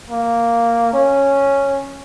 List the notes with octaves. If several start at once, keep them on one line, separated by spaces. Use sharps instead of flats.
A#3
C#4